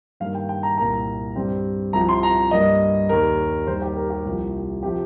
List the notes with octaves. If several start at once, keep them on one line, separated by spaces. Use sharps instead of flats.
G2 D#3 A#3 F5
G5
G5
A#5
C2 A#2 A#3 A#5
G2 G3 C4
C2 C3 F3 A#5
C6
A#5
G2 G3 A#3 D#5
D#2 D#3 G3 A#3 A#4
D#2 D#3 G3 A#3 C5
G4
A#4
G4
C2 C3 F3 A#3
C3 F3 G4